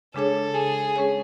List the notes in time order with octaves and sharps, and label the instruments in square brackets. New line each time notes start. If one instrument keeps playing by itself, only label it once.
[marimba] C#3 G#3 D4 G#4 C#5 [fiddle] A4
[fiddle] G#4
[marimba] G#3 C#4 G#4 C#5